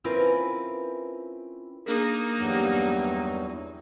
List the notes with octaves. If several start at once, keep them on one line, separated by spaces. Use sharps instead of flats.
C4 C#4 E4 F4 A#4 B4
A#3 D4 D#4 G#4 A#4
E2 G2 F#3